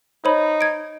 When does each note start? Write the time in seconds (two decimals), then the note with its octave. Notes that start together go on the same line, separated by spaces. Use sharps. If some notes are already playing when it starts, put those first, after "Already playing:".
0.25 D#4 C5 C#5 B5
0.61 G#6 D7